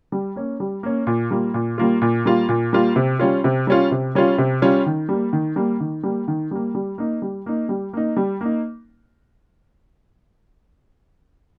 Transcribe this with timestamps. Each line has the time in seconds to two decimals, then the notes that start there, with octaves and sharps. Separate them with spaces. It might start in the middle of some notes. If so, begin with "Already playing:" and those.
0.12 G3
0.36 A#3 C#4
0.60 G3
0.83 A#3 C#4
1.07 A#2
1.31 G3 A#3 F4
1.54 A#2
1.78 G3 A#3 F4
2.02 A#2
2.25 G3 A#3 F4
2.49 A#2
2.73 G3 A#3 F4
2.96 C3
3.19 G3 C#4 F4
3.44 C3
3.67 G3 C#4 F4
3.91 C3
4.15 G3 C#4 F4
4.38 C3
4.62 G3 C#4 F4
4.86 D#3
5.09 G3 A#3
5.33 D#3
5.56 G3 A#3
5.81 D#3
6.03 G3 A#3
6.28 D#3
6.51 G3 A#3
6.75 G3
6.98 A#3 D#4
7.22 G3
7.46 A#3 D#4
7.69 G3
7.93 A#3 D#4
8.17 G3
8.41 A#3 D#4